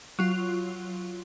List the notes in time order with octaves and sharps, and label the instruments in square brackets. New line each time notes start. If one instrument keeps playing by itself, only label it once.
[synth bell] F#3 F4